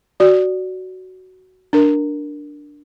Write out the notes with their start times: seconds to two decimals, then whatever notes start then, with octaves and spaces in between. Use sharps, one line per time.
0.20 F#4 D5
1.73 D4 A#4